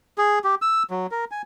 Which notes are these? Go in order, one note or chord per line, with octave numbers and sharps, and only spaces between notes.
G#4
G4
E6
F#3
A#4
G#5